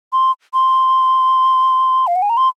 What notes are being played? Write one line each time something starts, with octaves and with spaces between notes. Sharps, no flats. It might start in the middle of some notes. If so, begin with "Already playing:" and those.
C6
C6
F5
F#5
G#5
A#5
C6